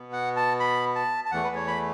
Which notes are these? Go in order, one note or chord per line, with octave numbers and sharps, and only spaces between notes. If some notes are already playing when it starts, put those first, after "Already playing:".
Already playing: B2 B3
F#5
A5
B5
A5
A5
E2 E3 A3 F#5
B4
C#5
B5